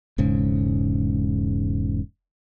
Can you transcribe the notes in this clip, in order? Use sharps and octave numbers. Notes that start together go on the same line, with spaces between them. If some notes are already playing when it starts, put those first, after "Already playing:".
E1 G#2 C#3